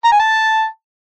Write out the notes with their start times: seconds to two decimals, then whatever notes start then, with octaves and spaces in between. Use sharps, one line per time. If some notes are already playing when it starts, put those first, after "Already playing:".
0.05 A#5
0.12 G#5
0.20 A5